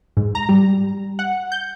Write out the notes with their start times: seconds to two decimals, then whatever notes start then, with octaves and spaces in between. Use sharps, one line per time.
0.17 G#2
0.35 A#5
0.49 G3
1.19 F#5
1.52 G6